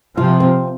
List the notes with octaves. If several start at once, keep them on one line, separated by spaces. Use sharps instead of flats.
C3 F3 F4
C4